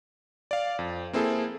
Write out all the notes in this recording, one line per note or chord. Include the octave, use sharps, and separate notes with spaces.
D5 F5
F2
A#3 C4 E4 G#4 A4